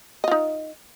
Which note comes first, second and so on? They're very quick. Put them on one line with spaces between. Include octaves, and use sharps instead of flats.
D#5 F4 D#4